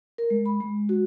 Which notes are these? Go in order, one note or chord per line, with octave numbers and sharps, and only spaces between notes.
A#4
G#3
B5
G#3
F#4